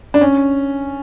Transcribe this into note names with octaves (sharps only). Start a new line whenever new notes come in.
D4
C#4